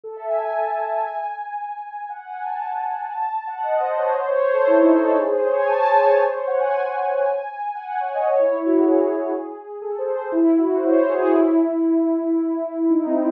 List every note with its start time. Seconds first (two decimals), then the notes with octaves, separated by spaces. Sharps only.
0.04 A4
0.17 E5
0.30 G#5
0.56 A5
0.72 A5
0.89 G#5
1.07 G#5
2.09 F#5
2.27 G#5
2.44 A5
3.12 A5
3.47 F#5
3.64 D#5
3.80 C5
3.90 D#5
3.98 C#5
4.15 C5
4.28 C#5
4.49 C5
4.53 A4
4.67 E4
4.79 D#4
4.92 A4
5.05 A4
5.19 G#4
5.31 C5
5.44 C#5
5.57 G#5
5.69 A5
5.87 G#5
6.04 C#5
6.21 C5
6.33 C#5
6.47 F#5
6.60 G#5
7.75 F#5
8.00 C#5
8.14 D#5
8.27 C#5
8.39 E4
8.52 E4
8.66 F#4
8.78 G#4
9.82 A4
9.99 C5
10.32 E4
10.58 F#4
10.75 C5
10.84 C#5
10.96 C5
11.09 G#4
11.22 E4
11.36 E4
12.90 D#4
13.06 C4